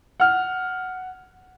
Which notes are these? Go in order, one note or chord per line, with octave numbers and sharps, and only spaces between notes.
F#5 F6